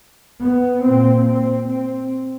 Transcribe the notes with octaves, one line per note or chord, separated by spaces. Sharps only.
B3
A#2 C4
C4
C4